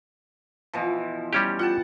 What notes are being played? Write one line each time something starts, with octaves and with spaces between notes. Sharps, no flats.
B2 E3 F3
G3 C#4 G4
F4 F#5 G5 A5